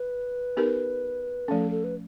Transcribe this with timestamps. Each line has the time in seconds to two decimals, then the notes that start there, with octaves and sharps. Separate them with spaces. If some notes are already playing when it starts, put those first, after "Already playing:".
Already playing: B4
0.57 B3 D#4 G4 A#4
1.48 F3 A3 C#4 A4
1.71 A4
1.84 B4